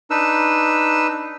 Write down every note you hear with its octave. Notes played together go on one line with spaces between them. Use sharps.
D4 D#4 B4 E6